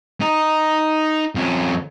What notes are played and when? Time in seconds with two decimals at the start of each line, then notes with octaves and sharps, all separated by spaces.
0.21 D#4
1.35 F2 C#4